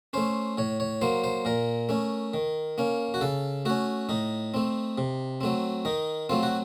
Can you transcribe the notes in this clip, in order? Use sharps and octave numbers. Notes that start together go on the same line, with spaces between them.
A3 C#4 C5
A2 C#5
C#5
F#3 A#3 C5
C5
A#2 A#4
A3 C#4
D#3
A#3 C#4
F#4
C#3 A4
A3 C#4 F#4
A2 D#4
A3 C4
C3
F#3 A3 C4
D#3 D#4
F#3 A3 C4 F4
F#4